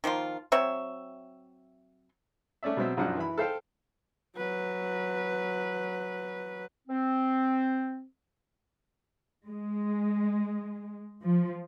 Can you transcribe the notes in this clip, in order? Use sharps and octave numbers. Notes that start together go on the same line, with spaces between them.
D#3 F3 A#3 F4
F#3 C4 C#5 E5
A3 C#4 D5 E5
B2 F#3 C4 E5
B1 F#2 F3 D4 F#5
E3 E4 B5
A4 C5 F5 G5
F#3 B4
C4
G#3
F3